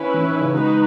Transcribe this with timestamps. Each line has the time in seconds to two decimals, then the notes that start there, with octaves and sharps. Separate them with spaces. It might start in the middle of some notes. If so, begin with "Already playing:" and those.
Already playing: D#3 C#4 E4 B4
0.14 E3
0.27 D#3
0.40 C#3
0.52 D#3 G#3 D#4 F#4 B4